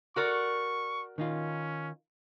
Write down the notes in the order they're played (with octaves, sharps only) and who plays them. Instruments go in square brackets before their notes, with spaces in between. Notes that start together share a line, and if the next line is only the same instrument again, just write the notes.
[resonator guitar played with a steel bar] F#4 A#4 D5 [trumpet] C#6
[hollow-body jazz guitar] D#3 D#4 F4 [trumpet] C#4